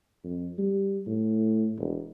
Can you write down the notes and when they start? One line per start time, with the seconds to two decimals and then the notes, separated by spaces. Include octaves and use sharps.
0.24 F2
0.59 G3
1.07 A2
1.78 E1